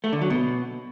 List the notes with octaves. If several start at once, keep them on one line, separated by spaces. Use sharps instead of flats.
A3
D3
F#3
B2